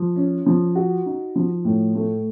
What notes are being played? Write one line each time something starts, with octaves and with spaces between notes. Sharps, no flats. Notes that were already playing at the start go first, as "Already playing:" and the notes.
Already playing: F3
C#4
F3
F#4
D#4
F3
A2
A3